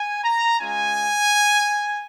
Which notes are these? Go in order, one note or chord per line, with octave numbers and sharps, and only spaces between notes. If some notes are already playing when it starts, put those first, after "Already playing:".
Already playing: G#5
A#5
G#3 C#4 F4 G#5